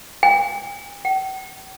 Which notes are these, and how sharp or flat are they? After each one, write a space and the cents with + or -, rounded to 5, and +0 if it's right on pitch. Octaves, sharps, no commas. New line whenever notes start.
G5 +45
G5 -45